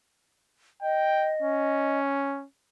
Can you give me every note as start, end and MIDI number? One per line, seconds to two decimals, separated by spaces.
0.82 1.99 75
0.82 1.33 79
1.42 2.45 61